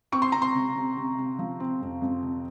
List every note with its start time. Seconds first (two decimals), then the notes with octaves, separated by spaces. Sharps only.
0.12 C4 C#6
0.22 C6
0.32 C4 A#5
0.42 C6
0.55 C3
0.76 C3
0.97 C3
1.18 C3
1.39 F3
1.60 C4
1.81 F2
2.02 F2
2.23 C3